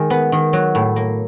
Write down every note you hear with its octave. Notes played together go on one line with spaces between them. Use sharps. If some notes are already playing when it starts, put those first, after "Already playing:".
Already playing: D#3 G#3
B3
D#3
F#3
A2
A#3